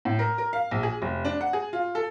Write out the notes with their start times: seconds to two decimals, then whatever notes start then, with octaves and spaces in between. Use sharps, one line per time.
0.05 A2
0.19 A#4
0.38 A#4
0.53 F5
0.71 A#1
0.83 G#4
1.02 F1
1.25 D4
1.41 F#5
1.53 G#4
1.73 F4
1.95 A4